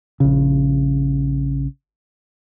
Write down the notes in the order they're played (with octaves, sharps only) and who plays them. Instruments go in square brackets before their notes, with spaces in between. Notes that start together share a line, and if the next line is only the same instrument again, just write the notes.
[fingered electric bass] A#1 C#3